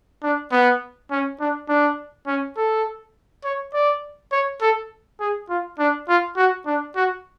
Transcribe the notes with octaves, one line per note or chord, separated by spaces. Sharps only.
D4
B3
C#4
D4
D4
C#4
A4
C#5
D5
C#5
A4
G#4
F4
D4
F4
F#4
D4
F#4